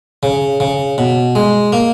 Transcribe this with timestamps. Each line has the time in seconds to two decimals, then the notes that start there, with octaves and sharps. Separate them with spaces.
0.23 C#3
0.60 C#3
0.98 B2
1.35 G#3
1.72 A#3